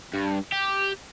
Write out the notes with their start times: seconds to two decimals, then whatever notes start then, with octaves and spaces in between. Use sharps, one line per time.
0.14 G2
0.52 G4